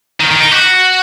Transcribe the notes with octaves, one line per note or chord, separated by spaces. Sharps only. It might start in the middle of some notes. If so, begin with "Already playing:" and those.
D#3
D#3
D#4
F#4